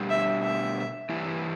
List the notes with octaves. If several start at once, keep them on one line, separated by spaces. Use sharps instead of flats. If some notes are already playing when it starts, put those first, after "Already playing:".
Already playing: B2 G3 D4 G4
E5
E5
G2 E3 G3 E4